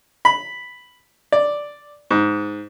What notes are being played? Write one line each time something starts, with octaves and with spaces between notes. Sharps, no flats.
B5
D5
G#2